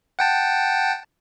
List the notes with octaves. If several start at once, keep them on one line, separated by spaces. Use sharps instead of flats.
F#5 G5 A5